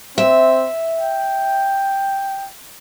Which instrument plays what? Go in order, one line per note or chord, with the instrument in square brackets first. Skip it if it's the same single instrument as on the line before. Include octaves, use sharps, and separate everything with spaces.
[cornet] C4 [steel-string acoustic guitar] E5
[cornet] G5